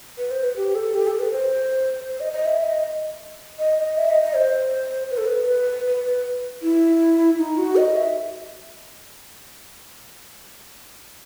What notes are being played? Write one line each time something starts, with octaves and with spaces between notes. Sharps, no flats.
B4
C5
B4
G4
A4
G4
A4
B4
C5
C5
D#5
D#5
E5
D#5
D#5
D#5
E5
D#5
D#5
C5
B4
A4
B4
B4
B4
E4
D#4
F#4
D#5
E5